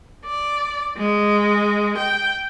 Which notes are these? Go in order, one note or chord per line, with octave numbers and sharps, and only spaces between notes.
D5
G#3
G5